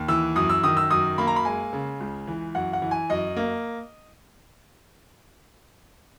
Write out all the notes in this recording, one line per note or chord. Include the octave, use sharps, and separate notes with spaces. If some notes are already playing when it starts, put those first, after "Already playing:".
Already playing: D#2
E3 E6
F#2 D#6
E6
D#3 D#6
E6
F#2 D#6
A#3 B5
A#5
B5
G#3 G#5
C#3
C#2
E3
F#2 F#5
F#5
E3
G#5
F#2 D#5
A#3